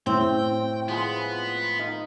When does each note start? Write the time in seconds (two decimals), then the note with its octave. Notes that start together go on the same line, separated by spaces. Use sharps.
0.06 A2 C4 G5
0.88 F3 G#3 B3 B5
1.79 D#4 D#5 F5